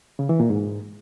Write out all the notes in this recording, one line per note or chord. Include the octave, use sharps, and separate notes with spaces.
C#3
E3
A#2
G#2